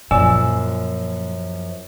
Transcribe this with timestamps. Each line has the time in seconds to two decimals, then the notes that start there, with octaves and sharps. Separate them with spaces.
0.11 F#2 A#2 F3 D5 G#5 E6